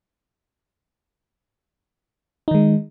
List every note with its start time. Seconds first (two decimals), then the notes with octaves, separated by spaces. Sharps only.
2.48 D#4
2.51 D#3
2.55 G#3